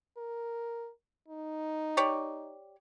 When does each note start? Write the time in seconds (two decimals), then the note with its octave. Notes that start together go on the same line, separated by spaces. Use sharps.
0.18 A#4
1.28 D#4
1.97 G4 C#5 D5